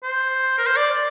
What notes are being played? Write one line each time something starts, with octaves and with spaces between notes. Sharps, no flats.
C5
A#4
C5
D5